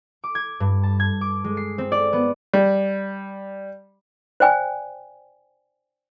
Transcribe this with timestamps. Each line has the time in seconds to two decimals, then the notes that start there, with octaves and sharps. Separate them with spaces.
0.24 D6
0.35 G#6
0.60 G2
0.83 A5
1.00 G#6
1.21 D6
1.44 G#3
1.57 C7
1.78 C4
1.92 D5
2.13 B3
2.54 G3
4.40 C5 D5 G5 G#5